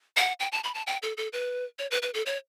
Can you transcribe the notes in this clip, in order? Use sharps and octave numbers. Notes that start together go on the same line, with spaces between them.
F#5
G5
A5
B5
A5
G5
A4
A4
B4
C#5
B4
B4
A4
C#5